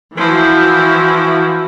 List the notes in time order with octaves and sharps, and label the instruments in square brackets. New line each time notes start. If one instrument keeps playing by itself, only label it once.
[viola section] E3 F#4 [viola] F3 E4